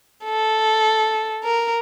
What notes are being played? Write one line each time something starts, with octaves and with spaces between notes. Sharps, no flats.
A4
A#4